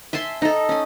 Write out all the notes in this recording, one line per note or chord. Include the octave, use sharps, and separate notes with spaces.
E5 G#5 A5 C6
D#4 A4
C#4 G#5